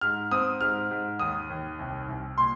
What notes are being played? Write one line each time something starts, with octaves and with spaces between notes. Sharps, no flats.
G#2 F6
C4 D#6
G#2 F6
G#2
D#2 D#6
D#2
C2
C2
A#2 C6